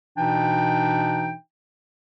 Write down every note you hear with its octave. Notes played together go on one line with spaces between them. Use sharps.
B2 E3 D4 D#4 G5